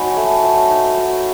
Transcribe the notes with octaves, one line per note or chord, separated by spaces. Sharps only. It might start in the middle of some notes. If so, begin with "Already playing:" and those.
Already playing: F#3 D#4 G#5 B5 C#6
A3
F#3
D#4
F#3